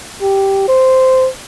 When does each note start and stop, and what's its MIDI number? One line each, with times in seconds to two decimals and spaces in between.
0.22 0.67 67
0.68 1.29 72